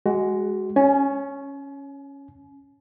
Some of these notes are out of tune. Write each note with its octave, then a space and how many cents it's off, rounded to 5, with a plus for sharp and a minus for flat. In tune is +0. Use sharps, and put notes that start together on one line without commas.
G#3 +0 F#4 +20
C#4 +0 G#5 +40